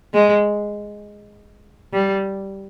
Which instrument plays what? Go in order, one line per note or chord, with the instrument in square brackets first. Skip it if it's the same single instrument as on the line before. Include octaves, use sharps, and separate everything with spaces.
[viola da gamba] G#3
G3